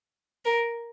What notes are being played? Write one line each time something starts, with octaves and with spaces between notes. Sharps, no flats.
A#4